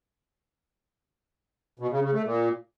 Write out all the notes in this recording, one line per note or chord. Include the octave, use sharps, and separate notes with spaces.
B2
C#3
C#3
A3
A#2